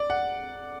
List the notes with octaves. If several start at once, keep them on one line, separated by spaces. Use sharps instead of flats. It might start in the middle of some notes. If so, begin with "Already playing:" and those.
Already playing: D5
F#5